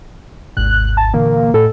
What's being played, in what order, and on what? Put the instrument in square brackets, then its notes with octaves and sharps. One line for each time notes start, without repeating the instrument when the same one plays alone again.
[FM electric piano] G#1 D#2 G#2 [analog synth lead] F#6
[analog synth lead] A5
[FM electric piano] A#2 D3 E3 [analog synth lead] A#3
[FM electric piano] A2 [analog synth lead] A4